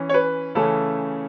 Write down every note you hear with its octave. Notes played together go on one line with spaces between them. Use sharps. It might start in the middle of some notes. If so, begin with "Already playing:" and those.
Already playing: E3 C#4
C#5
B4
C#3 E3 A3 C#4 A4